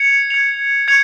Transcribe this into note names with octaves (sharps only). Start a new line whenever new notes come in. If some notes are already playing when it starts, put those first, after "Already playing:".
Already playing: G#6 C#7 F7
G#6 C#7 F7
G#6 C#7 F7